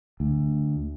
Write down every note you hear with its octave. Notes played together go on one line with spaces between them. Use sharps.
D2